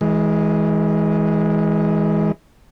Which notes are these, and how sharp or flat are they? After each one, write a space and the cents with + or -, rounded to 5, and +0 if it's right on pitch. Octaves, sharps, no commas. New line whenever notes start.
E3 -35 G#3 +0